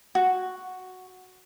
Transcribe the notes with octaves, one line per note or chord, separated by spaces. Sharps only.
F#4